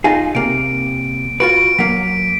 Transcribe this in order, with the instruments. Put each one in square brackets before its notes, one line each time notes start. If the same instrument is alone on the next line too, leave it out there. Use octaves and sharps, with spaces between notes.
[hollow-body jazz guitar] D#4 F4 G#4
[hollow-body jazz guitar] C3 A#3 [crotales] D7
[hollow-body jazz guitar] F4 F#4 B4 [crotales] D7
[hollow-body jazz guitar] F#3 A#3 [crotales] B6